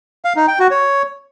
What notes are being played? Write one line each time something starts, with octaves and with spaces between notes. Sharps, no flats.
F5
D#4
G5
F#4
C#5